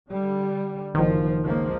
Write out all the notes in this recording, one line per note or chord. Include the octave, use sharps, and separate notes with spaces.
D3 G3
F#1 D#3 F3
C#2 F3 A#3